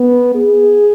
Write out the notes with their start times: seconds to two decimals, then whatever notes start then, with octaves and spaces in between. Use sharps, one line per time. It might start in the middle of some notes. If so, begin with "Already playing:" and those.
Already playing: B3
0.35 G#4